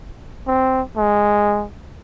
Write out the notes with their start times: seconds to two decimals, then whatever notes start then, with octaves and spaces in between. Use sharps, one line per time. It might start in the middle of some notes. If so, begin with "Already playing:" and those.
0.47 C4
0.97 G#3